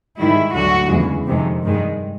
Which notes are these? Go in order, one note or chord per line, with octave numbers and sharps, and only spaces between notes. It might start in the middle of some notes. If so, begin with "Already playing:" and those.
G#2 D#3 G3 E4
D2 D3 F#3 F#4
E2 C#3 E3 G#3
F2 C3 D#3 G#3
G2 D#3 G#3